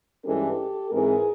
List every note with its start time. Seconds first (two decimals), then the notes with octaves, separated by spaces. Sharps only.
0.25 G2 E3 G#3 C#4 G4 A4
0.91 G#2 E3 G#3 C4 G#4 A#4